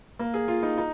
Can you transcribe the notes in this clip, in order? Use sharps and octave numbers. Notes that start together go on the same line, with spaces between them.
A#3
G#4
F4
D#4
D#4